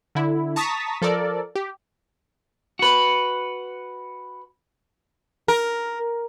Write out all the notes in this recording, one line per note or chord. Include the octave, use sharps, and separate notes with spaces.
D3 E4
A5 A#5 C#6 D#6 A6 B6
F3 A4 A#4 D5
G4
F#4 B4
A#4